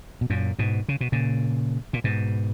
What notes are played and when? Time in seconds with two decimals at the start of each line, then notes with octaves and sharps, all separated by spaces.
0.21 B2
0.30 F#2 A#2
0.59 G#2 B2
0.89 C#3
1.01 B2
1.12 A#2 C#3
1.93 A#2
2.04 G#2 B2